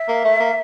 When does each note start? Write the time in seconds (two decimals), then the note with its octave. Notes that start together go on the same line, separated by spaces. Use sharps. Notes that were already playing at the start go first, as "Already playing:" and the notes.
Already playing: E5
0.08 A#3
0.24 A3
0.40 A#3